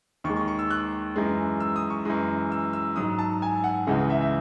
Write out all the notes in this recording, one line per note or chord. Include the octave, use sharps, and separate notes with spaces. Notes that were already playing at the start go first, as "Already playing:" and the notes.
D#2 D#3 G#3 C#6
C#6
C#6
E6
F#6
F#2 E3 G#3
E6
D#6
C#6
F#2 E3 G#3 D#6
E6
E6
G#2 F#3 D#6
A5
G#5
F#5
C#2 C#3 E3 G#3 F#5
F#5
E5
E5